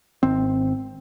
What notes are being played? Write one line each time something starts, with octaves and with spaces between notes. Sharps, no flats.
G#1 C4